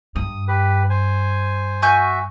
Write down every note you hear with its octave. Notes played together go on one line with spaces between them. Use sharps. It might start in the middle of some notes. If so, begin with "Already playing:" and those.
G2 D#6
G4 B4
C5 G#5
F#4 E5 G#5 C#6 G6